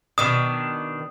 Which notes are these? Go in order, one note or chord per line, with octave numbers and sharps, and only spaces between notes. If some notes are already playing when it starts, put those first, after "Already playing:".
B2 D#3 D4 D#6